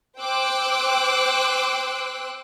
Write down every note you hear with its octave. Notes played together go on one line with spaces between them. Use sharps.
C5 G5 C6 D6 E6 F#6